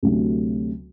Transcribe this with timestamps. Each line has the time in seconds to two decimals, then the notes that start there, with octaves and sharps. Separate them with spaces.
0.03 D2 C3 F#3 A3